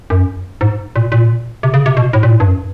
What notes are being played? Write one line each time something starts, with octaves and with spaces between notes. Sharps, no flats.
F#2
G#2
A#2
A#2
C3
C#3
C3
B2
A2
A#2
A2
G2
F#2